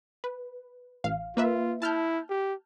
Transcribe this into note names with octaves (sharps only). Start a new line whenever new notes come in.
B4
A1 F5
A#3 F4 B4 E5
E4 A5 F6 G6
G4